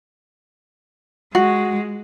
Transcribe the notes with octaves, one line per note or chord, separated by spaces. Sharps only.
G#3 F#4